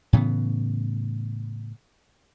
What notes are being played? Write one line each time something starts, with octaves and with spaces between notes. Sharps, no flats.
A2 C#3 E3 B3